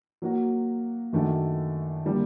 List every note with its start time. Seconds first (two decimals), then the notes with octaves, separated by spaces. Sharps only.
0.22 F#3 A#3 F#4
1.13 F#2 D#3 A3 D4 F#4
2.05 D3 G3 A#3